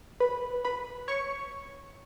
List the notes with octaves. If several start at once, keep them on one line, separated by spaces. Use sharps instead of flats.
B4 B5
B4 B5
C#5 C#6